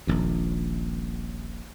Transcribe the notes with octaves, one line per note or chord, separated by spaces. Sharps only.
D#1 A#1 D#2